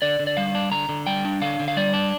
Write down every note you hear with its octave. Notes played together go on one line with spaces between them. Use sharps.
D3 D5
D3
D5
G3 F5
D4
D3 A#5
D3
G3 G5
D4
D3 F5
D3
F5
G3 D5
D4